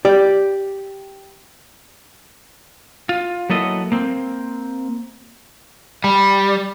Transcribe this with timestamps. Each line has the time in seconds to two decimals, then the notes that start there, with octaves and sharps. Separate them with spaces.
0.05 G4 D5
3.09 F4
3.50 F#3 A#3 B3 E4 A4 D#5
3.92 A#3 C4
6.04 G3